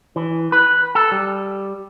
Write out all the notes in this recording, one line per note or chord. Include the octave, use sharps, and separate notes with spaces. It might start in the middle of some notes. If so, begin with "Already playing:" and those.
E3
B4
A4
G3